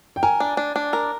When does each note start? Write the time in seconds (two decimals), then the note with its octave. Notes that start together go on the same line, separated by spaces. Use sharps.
0.16 G5
0.23 A#4 G#5
0.40 D4
0.57 D4
0.76 D4
0.93 A#4